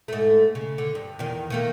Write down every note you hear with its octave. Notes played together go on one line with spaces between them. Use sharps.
G#2 A3
C#3
D3
G2
E2 D#3
D#3 A3 A#3